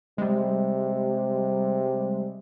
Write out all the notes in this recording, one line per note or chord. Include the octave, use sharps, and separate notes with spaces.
C3 G3 G#3